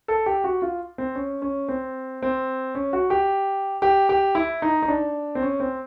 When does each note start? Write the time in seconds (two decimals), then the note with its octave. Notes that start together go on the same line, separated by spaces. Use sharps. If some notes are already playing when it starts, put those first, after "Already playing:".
0.08 A4
0.26 G4
0.44 F#4
0.62 F4
0.98 C4
1.15 C#4
1.42 C#4
1.69 C4
2.22 C4
2.75 C#4
2.93 F#4
3.10 G4
3.82 G4
4.09 G4
4.35 E4
4.62 D#4
4.82 D#4
4.88 D4
5.35 C4
5.42 C#4
5.60 C4